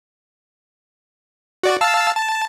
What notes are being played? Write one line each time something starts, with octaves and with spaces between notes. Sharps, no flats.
F#4 D5
F5 A5 E6
A5